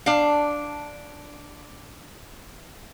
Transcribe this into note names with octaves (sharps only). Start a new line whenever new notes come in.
D4 F5